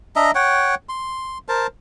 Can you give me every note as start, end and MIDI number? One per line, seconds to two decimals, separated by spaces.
0.16 0.31 62
0.16 0.31 75
0.16 0.31 76
0.16 0.31 82
0.35 0.75 73
0.35 0.75 78
0.35 0.75 79
0.89 1.38 84
1.48 1.67 70
1.48 1.67 72
1.48 1.67 81